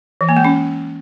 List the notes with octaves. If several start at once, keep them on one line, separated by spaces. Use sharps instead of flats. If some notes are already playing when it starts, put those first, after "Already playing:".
E3
A#3
G#3
C#4